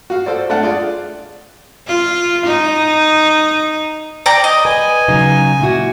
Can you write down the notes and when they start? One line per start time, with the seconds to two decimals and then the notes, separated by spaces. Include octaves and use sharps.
0.10 F#4 F5
0.26 A4 C5 D5
0.50 A3 D4 F5 F#5 A5
0.63 F4 G#4 D5
1.87 F4
2.46 D#4
4.26 D5 G5 A#5
4.44 D#5
4.65 B4 G#5
5.08 C#3 F#3 D#4
5.60 A#2 E4 F#4